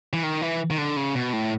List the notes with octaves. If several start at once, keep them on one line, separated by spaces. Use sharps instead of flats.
E3
D#3
E3
D#3
D3
C#3
B2
A2